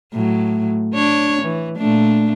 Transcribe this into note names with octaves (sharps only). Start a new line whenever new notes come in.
A2 F#3
D4 C#5
E3
A#2 A3 D4